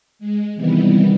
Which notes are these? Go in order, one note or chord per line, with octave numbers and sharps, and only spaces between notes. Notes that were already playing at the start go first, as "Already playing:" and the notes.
G#3
C3 D#3 E3 G3 B3